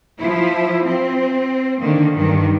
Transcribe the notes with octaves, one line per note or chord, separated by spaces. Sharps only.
F3 E4
C4
D3 D#3 A#3
G2 D#3